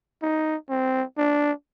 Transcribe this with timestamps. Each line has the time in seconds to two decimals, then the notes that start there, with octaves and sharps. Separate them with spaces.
0.23 D#4
0.70 C4
1.18 D4